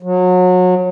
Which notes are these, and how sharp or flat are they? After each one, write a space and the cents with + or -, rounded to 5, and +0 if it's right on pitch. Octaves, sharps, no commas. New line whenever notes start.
F#3 -30